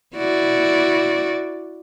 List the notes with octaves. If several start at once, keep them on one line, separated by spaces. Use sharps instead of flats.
E4 F#4 D5